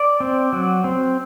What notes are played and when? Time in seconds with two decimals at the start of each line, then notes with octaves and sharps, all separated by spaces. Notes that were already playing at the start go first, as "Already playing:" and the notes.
Already playing: D5
0.20 C4
0.53 F#3
0.84 C4